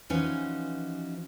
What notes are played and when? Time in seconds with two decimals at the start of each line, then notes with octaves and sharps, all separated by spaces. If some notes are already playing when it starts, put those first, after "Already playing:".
0.09 E3 F3 C#4 D#4 F#4